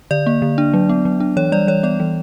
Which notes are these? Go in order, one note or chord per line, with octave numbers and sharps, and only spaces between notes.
D3 D5
A#3
D3
D4
F#3
B3
F#3
D4
E3 C#5
G3 D5
E3 C#5
B3 D5
E3